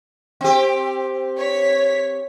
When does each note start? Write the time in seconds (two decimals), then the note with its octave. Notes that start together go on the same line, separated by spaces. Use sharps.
0.41 C4 G4
1.38 C#5 B6